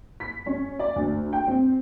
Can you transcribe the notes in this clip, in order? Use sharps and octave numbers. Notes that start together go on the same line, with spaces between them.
B6
C#4
D5
D2
G5
C4